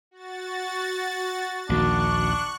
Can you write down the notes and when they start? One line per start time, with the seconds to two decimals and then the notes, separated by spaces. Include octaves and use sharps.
0.11 F#4 A6
1.69 A#1 D#2 D#3 A#3 D4 F#4 C#6 F#6